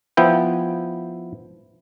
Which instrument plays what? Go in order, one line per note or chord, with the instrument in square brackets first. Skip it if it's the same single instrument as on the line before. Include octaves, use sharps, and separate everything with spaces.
[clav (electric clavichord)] F3 B3 E4 G5